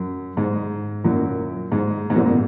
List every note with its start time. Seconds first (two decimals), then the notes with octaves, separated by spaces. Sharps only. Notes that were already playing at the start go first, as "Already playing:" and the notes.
Already playing: F#2
0.37 G#2
1.04 F#2 A#2
1.72 G#2
2.10 G#2
2.16 F#2 A#2
2.27 B2